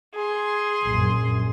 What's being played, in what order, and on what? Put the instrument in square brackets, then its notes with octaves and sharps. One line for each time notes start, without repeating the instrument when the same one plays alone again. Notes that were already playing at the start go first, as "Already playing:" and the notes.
[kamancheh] G#4 C6
[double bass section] A#1 F#2